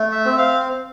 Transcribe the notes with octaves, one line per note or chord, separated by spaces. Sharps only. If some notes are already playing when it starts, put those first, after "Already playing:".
Already playing: A3
E5
C4
F5